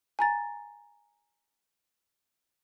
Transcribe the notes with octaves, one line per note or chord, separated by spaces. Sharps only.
G#5 A#5 A6